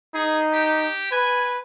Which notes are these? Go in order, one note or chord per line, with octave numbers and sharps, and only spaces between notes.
D#4 G#4
G4
B4 G#5